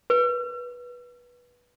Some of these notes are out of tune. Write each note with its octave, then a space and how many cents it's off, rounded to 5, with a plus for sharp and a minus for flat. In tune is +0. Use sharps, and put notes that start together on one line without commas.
B4 -15